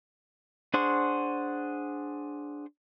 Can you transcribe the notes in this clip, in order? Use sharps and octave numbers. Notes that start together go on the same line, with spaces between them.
D4 G#4 C5 F#5 C#6